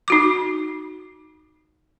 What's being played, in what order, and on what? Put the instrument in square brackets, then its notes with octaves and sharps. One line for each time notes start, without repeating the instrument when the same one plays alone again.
[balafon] D#4 F#4 D6